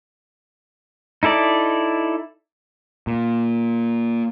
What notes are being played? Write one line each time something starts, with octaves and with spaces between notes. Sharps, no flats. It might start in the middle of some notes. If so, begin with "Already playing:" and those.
D#4 E4 A4 D5
A#2